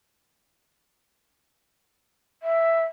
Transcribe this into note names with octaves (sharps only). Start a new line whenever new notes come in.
E5